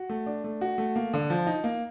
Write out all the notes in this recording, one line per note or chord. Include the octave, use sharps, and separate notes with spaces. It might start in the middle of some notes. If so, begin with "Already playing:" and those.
Already playing: F#4
A3
D4
A3
F#4
A3
A#3
D3
F3
D#4
A#3